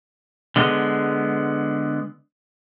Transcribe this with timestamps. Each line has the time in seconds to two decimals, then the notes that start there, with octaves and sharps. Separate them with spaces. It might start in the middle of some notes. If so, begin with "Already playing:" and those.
0.56 D3 G#3 B3